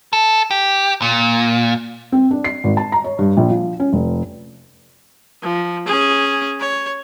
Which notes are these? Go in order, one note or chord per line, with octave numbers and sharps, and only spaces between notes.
A4
G4
A#2
C4
D4
C7
G#1
A5
A#5
C#5
G2
A#1
F3
C#4
F1
F3
C#4 G#4
C#5